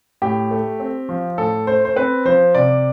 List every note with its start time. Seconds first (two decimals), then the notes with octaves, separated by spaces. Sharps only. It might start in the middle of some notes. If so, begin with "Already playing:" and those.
0.22 A2 G4
0.51 A3
0.80 C4
1.09 F3
1.38 A2 A4
1.67 A3 C5
1.85 C5
1.96 C4 B4
2.25 F3 C5
2.55 C3 D5